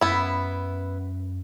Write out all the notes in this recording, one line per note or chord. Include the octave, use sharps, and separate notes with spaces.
F#2 B3 E4